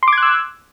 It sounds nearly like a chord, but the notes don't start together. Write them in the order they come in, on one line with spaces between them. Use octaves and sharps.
C6 D6 G#6 F#6 E6